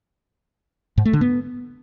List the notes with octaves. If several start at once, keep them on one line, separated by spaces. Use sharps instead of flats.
G#2
A3
D3
B3